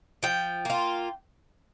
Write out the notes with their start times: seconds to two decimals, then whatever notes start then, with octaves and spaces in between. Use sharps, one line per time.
0.23 F3 G5
0.65 A#3 F4